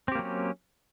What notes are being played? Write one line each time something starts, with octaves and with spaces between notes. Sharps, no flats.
F#3 A#3 C4 C#4 G4